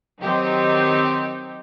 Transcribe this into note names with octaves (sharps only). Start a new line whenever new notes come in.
D#3 F#3 C4 D#4 G4